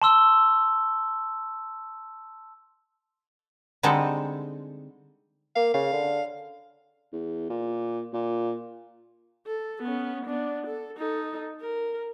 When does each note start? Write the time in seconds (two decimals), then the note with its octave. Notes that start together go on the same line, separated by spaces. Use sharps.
0.02 A5 C6 E6 G7
3.83 D3 G3 G#3 C4 D#4 A4
5.56 A#3 F5
5.74 C#3 F5
5.93 D3
7.12 E2
7.50 A#2
8.13 A#2
9.47 A4
9.82 B3 C#4
10.26 B3 D4
10.67 A4
10.97 D#4 A4
11.61 A#4